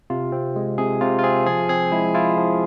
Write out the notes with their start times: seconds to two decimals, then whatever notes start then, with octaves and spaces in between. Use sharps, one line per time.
0.10 C3 F4
0.32 C4
0.56 G#3
0.78 C3 G#4
1.01 C3 F4
1.19 F4
1.24 C4 G#4
1.46 F3 G#4
1.69 C4 G#4
1.92 G#3 E4
2.15 E4 F4
2.37 F3